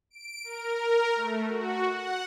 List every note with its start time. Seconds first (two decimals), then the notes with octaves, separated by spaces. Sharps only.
0.10 D7
0.44 A#4
1.16 A3
1.48 F#4
1.85 F#5